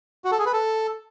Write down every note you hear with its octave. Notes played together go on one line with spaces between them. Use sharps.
F#4
A4
G#4
B4
A4